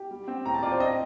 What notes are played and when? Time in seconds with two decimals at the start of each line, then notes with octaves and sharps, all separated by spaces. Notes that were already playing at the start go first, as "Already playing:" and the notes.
Already playing: G4
0.11 G3
0.28 C4
0.45 A2 A#5
0.54 A5
0.63 F4 D5
0.72 C5
0.80 C4 D#5